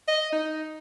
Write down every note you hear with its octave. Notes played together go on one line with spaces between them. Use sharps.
D#5
D#4